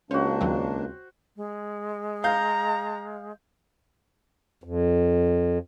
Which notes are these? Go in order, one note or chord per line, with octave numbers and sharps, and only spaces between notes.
C#2 A#3 C#4 D4 F#4 C5
D#2 F#3 C4
G#3
F5 A#5 G6
F2